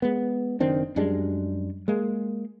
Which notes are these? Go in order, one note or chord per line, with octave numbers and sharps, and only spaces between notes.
G#3 B3
F#1 D#3 C4 D4
F#2 G3 G#3 D4
G#3 A#3